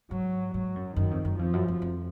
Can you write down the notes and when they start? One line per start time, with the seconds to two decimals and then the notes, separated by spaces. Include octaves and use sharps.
0.11 G#2 F#3
0.54 G#2 F#3
0.76 F#2
0.96 F#2 D#3
1.11 F2
1.25 F#2
1.39 F2 F3
1.53 F#2
1.68 F2
1.82 F2